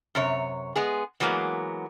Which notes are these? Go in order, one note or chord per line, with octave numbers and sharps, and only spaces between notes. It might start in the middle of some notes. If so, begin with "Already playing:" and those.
F#2 C3 C#5
G#3 B3 G#4
E3 F#3 G#3 A#3 B3